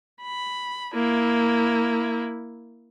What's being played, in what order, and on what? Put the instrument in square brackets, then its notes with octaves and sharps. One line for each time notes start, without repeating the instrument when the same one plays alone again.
[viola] B5
A#3 E4